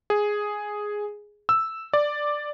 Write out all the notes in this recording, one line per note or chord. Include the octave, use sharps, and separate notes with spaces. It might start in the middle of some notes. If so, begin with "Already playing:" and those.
G#4
E6
D5